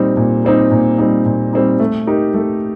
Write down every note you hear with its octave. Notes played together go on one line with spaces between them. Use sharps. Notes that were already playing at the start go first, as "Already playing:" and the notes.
Already playing: A#2 G3 C4 D#4
A#2
G3 C4 D#4
A#2
G3 C4 D#4
A#2
G3 C4 D#4
A3
D#4 G4 A#4
A3